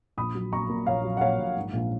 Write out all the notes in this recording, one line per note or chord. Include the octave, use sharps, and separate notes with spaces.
A#1 B5 D#6
F#3
A#1 A#5 C#6
A#2
A#1 C#5 F5
F#3
F#5
A#1 C#5 F5
A#1
G#2
A#1